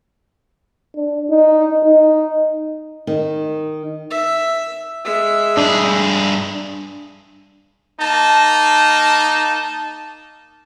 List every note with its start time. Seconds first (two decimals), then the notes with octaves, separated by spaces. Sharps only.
0.96 D4
1.30 D#4
1.84 D#4
3.07 D#3
4.11 E5
5.04 G#3 E5
5.57 G2 D4 G#4
8.00 A#3 D#4 A5